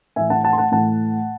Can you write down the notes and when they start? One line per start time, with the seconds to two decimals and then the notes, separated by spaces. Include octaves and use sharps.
0.16 A2 E3 A3 E5 G#5
0.30 F#5 A5
0.44 F#5 A5
0.53 C6
0.58 F#5 A5
0.72 A2 E3 A3 F#5 A5